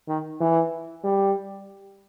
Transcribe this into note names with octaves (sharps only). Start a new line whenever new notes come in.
D#3
E3
G3